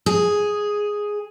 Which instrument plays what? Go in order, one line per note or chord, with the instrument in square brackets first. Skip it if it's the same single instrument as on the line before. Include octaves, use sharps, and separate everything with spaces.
[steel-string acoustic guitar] G#4